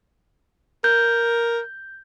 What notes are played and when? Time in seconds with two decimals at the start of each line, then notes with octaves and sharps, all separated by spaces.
0.84 A#4 G6